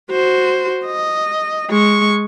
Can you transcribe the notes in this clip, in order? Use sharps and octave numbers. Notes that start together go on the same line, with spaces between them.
F#4 C5
D#5
G#3 C#6